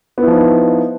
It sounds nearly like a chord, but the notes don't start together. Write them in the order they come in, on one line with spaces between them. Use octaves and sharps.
B3 E4 F3 D#4